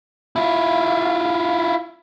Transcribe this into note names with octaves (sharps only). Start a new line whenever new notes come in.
E4 F4